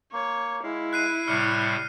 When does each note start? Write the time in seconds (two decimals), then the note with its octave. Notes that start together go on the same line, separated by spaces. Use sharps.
0.13 A#3 C#5
0.63 G#3 E4 F5
0.93 F#6 C7 D#7
1.28 A2 C3 G3 C#6 F6 C#7